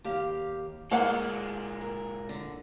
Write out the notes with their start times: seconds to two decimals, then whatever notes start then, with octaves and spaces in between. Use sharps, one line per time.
0.04 D#2 G4 F5
0.91 A#2 G#3 A#3 F5 F#5
1.81 A#4
2.29 D3